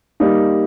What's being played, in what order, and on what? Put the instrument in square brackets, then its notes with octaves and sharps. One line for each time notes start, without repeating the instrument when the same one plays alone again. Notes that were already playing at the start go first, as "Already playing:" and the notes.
[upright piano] G3 A#3 D#4